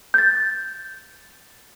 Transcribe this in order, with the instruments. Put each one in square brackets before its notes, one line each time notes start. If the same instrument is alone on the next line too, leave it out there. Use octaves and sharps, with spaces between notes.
[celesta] G6 A6